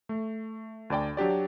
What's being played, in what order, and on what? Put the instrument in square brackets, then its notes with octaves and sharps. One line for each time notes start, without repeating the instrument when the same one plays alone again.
[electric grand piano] A3
D2 D4 D5 G5
F#3 D4 G4 D5